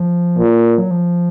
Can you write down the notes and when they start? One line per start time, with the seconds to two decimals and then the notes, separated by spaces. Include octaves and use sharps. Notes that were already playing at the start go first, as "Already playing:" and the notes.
Already playing: F3
0.37 A#2
0.78 F#3
0.91 F3